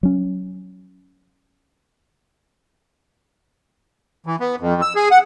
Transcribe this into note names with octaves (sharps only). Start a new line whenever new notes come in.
F#3 C#4
E3
B3
F2
E6
G#4
F#5